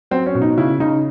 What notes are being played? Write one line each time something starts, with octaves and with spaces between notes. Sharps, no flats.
F#3 C4
C#4
B2
D#4
C#3 E4
C#3 D#4